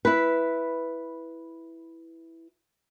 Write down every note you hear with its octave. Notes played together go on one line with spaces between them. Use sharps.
E4 B4